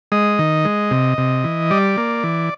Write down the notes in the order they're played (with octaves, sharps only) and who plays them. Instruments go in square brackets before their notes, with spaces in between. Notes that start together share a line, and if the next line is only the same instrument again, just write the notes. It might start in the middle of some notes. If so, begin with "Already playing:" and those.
[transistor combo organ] G#3 D#5
D#3
G#3
C3
C3
E3
G3 D5
A#3
E3